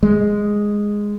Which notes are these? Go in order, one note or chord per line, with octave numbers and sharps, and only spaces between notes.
G#3